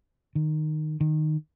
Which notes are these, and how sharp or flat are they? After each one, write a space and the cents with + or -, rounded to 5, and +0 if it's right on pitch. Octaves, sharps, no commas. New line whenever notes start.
D#3 -15
D#3 -15